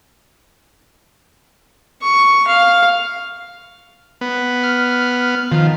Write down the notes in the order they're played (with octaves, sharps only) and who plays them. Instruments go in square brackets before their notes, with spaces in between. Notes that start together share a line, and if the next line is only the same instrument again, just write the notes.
[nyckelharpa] C#6
F5
[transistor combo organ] B3
[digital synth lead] F6
[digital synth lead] D#3 [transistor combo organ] F3